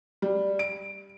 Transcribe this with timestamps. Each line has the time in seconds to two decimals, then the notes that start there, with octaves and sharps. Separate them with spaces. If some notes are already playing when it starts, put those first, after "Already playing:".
0.22 G3
0.59 D7